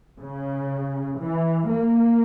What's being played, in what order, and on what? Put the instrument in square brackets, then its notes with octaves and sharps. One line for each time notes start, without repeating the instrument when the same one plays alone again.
[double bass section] C#3
E3
A#3